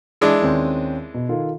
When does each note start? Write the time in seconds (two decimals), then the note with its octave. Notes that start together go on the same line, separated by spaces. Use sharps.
0.21 E3 G#3 D4
0.42 D#2 C4 C#4
1.14 B2
1.29 D#3 F4 A4